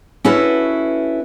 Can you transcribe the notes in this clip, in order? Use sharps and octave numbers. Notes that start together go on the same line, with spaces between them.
C#4 E4 F#4 A4 B4